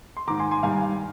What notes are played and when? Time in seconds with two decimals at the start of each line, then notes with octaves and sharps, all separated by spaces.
0.17 C6
0.28 G#2 D#3 A#5 D6
0.40 G#5 C6
0.51 G#5 C6
0.63 G2 D#3 F5 G#5